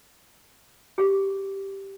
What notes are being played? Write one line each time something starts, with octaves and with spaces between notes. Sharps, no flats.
G4 G#4